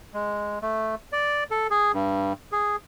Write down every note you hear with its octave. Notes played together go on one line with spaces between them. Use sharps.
G#3
A3
D5
A4
G#4
G2
G#4